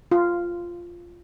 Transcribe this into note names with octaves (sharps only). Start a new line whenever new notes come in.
F4